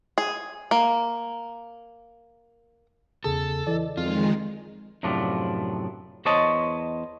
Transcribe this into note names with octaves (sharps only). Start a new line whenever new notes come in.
G#4
A#3
E2 C#3 G#4 A4
E3 D5 D#5
F2 D#3 G#3 F4
F#2 A2 C3 F3 D4
E2 C5 C#5 D#5 A5